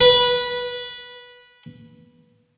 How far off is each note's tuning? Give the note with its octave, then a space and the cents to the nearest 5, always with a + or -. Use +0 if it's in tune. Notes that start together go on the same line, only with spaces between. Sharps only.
B4 -15